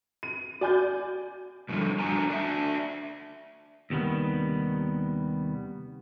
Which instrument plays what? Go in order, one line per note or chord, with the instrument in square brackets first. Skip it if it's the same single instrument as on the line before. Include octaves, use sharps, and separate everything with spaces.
[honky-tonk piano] D#7
[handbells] F#4 [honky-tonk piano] D5 G#5 G6
[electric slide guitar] F#2 A2 D3 D#3 F3 G3
D4 F#4 C5 G5 G#5 A#5
D4 E5
[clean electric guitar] D#2 C3 D#3 G3 B3